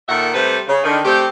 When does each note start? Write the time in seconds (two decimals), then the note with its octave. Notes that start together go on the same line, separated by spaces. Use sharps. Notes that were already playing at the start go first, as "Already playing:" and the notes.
0.09 A#2 D#3 A4 A#4 E5 F#5
0.34 C3 G3 A3 A4 B4 C5
0.67 C#3
0.84 D3 D#3
1.05 C3 A3 C4 G4